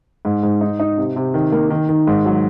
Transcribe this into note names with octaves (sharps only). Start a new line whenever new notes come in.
G#2
G#2
D#4
D#4
C3
C3
D#3
A#3
D#3
D#3
G#2
F#3